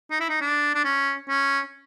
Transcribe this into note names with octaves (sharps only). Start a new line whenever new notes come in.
D#4
E4
D#4
D4
D4
C#4
C#4